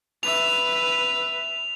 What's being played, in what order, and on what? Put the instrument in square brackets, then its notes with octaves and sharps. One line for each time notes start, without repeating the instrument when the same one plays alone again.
[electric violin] B4 E5 [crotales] F7